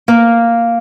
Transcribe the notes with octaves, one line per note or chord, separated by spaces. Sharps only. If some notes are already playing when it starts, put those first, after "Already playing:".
A#3